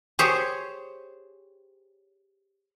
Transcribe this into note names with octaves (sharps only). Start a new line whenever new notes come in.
G4 G#4 C5 C#5